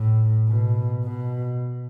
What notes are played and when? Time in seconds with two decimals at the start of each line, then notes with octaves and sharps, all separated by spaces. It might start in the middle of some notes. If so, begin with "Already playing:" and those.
Already playing: A2
0.48 B2
1.04 B2